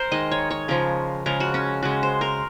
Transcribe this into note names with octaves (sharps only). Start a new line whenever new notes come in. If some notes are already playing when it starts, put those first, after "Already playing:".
Already playing: A#4 C5
D#3 G#3 D#5
C#5
C#5
C#3 F3 G#3 A#4
C#3 F3 G#3 A#4
F#4
C#4
C#3 G#3 F#4
C5
A#4